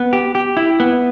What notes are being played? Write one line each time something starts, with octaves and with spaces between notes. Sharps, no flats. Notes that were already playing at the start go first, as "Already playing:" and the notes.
Already playing: B3
G4
G4
E4
B3